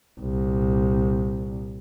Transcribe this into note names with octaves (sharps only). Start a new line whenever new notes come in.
C2 A#2